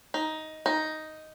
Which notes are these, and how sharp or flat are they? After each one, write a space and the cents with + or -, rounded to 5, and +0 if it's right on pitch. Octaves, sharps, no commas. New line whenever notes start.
D#4 +10
D#4 +5